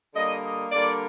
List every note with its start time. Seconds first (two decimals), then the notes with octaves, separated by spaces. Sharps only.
0.15 D3 G3 A#3 D#5
0.43 D#5
0.72 D3 G3 A#3 D5